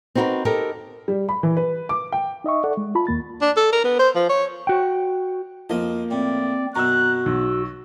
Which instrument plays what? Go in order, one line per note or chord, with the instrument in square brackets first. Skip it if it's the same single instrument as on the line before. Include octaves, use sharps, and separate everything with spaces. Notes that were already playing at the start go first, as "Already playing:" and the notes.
[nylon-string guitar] C4 D#4 F#4 G4 A#4 B4
D#4 G4 A4 A#4
[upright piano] G3
B5
E3
B4
D6
G5
[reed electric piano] D#4 D#5 E5 C#6
A4 D5 F#5
G#3
F4 A5 B5
D#2 A#3 A6
[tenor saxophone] D4
A4
A#4
B3
C5
F3
C#5
[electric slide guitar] F#4 G5
[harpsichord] F2 D#5 [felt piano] F3 A#3
[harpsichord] A2 [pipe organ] C4 [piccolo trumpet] D5
[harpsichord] F#2 B2 [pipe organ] F#4 [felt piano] A#5 E6 [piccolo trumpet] F#6
[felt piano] B1 [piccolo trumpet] E6